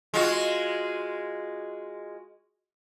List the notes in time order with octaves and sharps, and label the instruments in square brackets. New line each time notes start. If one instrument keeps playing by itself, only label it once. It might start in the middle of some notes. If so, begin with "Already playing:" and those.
[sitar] G#3 F4 F#4